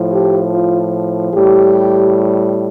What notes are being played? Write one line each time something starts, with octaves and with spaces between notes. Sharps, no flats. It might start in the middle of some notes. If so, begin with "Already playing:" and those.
Already playing: A2 F3
G4
F4
A2 G3 G4